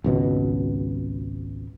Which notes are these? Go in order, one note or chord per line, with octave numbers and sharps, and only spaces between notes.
G#1 C#2 B2